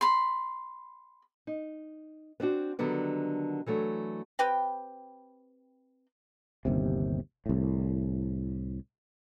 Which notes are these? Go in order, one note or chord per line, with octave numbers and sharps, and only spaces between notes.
B5 C6
D#4
B3 C4 D4 F#4
D3 D#3 F#3 G3 B3 D4
E3 F#3 A3 D4
C4 G4 B4 G5
G1 D#2 C3
C2 A2